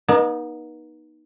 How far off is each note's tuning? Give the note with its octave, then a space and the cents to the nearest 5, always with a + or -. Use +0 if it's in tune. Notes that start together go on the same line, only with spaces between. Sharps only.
B3 -40 D#4 +0